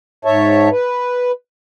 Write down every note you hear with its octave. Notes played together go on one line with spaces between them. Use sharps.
G#2 C#5 E5 A5
B4